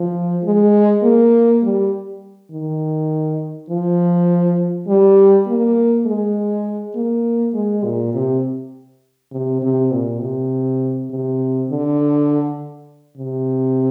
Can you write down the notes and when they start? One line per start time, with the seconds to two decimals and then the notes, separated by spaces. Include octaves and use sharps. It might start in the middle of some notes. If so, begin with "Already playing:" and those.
Already playing: F3
0.44 G#3
1.03 A#3
1.63 G3
2.51 D#3
3.70 F3
4.88 G3
5.47 A#3
6.06 G#3
6.95 A#3
7.54 G#3
7.84 A#2
8.14 C3
9.32 C3
9.62 C3
9.92 A#2
10.21 C3
11.10 C3
11.69 D3
13.17 C3